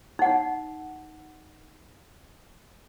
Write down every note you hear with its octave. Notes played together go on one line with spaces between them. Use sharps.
D#4 F#5